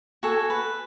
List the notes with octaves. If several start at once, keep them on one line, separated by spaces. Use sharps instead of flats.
F#4 A4 G#5
B4